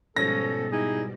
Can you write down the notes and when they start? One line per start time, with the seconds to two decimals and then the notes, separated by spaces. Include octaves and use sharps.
0.16 G#2 B2 F3 G3 C#4 A4 A#6
0.72 D#4 E4 G#4